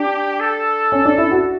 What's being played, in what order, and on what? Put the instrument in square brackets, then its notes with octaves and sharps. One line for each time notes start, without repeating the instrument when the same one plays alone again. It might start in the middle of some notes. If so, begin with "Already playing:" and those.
Already playing: [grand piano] D4 [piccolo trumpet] G4
[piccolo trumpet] A4
[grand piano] C#4
D4
E4
F#4